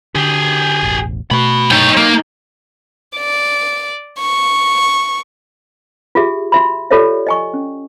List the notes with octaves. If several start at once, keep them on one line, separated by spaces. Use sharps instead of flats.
D3 G4 G#4
E1 A1
B2 A3 F#4 B5
B1 D#4 C#5 G5
A#3
D5
C#6
F4 G4 G#4 E5
F#4 E5 B5
F4 G4 A4 C#5 D5 E5
D#5 G#5 C#6
C#4